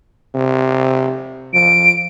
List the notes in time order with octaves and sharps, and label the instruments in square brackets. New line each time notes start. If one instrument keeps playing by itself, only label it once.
[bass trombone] C3
[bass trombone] F3 [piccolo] D7